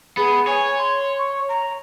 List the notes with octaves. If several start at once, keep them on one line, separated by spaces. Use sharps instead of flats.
B3 G#4
C#5 G#5
C6
C#6
A#5